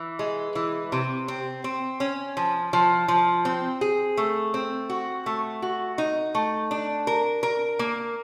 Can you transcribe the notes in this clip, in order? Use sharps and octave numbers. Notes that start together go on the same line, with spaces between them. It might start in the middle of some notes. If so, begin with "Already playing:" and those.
Already playing: E3
G#3
E3
C3
C4
C4
C#4
F3
F3
F3
C4
G#4
A3
C4
F#4
A3
F#4
D#4
A3
D4
A#4
A#4
A#3